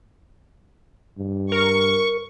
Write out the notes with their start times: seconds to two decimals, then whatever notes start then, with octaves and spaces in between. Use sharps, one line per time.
1.17 G2
1.52 A#4 C#6